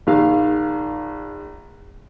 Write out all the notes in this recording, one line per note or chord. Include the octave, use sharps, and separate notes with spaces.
A#1 D#3 F5